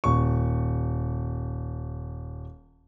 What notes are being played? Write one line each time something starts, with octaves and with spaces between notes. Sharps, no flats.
D#1 C#6